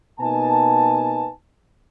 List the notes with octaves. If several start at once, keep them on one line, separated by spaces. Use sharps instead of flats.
B2 A#3 D#4 B4 G#5 A5